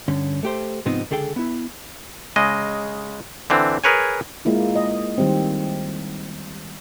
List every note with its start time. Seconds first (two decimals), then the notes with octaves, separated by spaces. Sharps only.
0.08 G2 D3 C#4
0.43 A3 G4 C5
0.85 G#2 C3 F3 B3 C4 D#4
1.11 C#2 D3 G#4 A4 G5
1.36 B3 E4
2.36 C#3 G#3 D#5
3.50 D3 E3 C4
3.84 G#4 A#4 B4 C#5 G#5
4.45 G#3 A#3 E4 F4
4.76 D#5
5.18 D#3 G3 C4